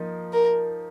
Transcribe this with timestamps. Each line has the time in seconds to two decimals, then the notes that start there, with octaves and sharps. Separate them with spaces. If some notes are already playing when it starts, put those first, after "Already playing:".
Already playing: F3 A#3 D#4
0.33 A#4